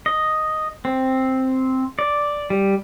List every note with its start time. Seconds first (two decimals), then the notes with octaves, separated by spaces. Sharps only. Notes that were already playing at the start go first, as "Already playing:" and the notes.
0.06 D#5
0.85 C4
1.99 D5
2.50 G3